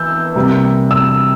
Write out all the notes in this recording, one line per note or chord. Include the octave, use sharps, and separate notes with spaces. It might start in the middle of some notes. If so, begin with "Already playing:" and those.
Already playing: E3 E6 G6
C3 G3 A#3
E6